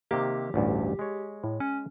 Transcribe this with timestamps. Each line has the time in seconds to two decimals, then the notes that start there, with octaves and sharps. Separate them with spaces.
0.11 C3 D#3 A#3 G4
0.54 A1 D2 G2
0.99 G#3 C#5
1.44 A2
1.60 C#4